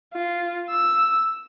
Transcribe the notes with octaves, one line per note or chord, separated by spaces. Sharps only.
F4
E6